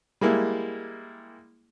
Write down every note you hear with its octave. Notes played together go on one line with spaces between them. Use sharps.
G3 G#3 A#3 E4